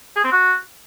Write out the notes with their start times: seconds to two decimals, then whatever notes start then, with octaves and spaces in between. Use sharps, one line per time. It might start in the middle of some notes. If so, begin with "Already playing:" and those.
0.16 G#4
0.24 C4
0.32 F#4